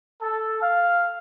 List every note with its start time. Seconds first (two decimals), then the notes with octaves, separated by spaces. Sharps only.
0.22 A4
0.61 F5